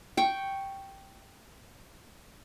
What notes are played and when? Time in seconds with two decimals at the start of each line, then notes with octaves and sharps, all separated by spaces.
0.17 G5 C#6